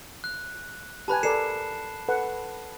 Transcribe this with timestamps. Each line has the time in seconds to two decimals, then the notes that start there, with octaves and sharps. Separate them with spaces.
0.24 F#6
1.08 G4 B4 G#5 A5 B5 F#6
1.23 A4 A#4 D5 C7 C#7 E7
2.08 A4 B4 F#5